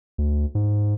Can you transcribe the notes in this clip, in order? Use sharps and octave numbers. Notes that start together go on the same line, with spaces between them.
D2
G#2